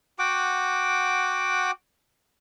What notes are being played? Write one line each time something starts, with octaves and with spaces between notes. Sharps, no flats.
F#4 F#5 G5 D6